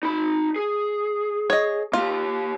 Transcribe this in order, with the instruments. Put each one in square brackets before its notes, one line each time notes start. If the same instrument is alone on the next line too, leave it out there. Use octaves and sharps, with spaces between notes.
[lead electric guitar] D#4 B5
G#4
[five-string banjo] C#5 D#5
[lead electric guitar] A#3 G4 [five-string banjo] F4